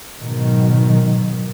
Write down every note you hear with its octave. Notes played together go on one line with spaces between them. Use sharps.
G#2 B2 D#3 F#3